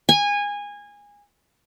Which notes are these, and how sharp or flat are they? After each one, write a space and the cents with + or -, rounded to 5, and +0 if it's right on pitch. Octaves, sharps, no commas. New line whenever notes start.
G#5 -20